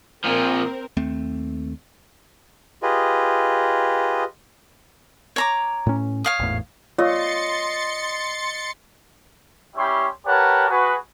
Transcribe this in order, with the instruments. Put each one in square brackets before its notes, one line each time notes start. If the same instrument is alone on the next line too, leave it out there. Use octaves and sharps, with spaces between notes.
[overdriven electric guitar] A#2 F3 [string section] C4 A#4
[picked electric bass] D#2 A3 C4
[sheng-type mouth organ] F4 G4 G#4 B4 D#5
[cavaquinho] C#5 A#5 D6
[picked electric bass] A2 C#4
[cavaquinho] C#5 F5 D#6
[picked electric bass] G#1 E2 A2
[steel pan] F4 [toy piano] C#5 C#6 E6 [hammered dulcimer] D#5 [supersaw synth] C6 A6 C#7
[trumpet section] G3 C#4 E4 G4 C#5 C6
G4 A#4 B4 C#5 F#5 A5
F#4 G#4 B4